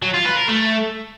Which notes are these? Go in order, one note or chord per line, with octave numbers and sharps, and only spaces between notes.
F#3
F4
B4
A#4
A3